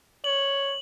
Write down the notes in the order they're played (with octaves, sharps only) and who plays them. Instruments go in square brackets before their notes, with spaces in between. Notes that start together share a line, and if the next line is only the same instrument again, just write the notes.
[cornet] C#5 [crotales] F#7